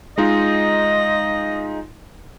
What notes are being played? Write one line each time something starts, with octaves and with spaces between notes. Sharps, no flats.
G#3 D#4 F4 D#5